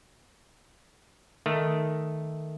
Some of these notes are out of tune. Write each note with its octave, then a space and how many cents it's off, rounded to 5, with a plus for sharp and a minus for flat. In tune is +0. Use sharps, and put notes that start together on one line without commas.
D#3 +0 A3 +0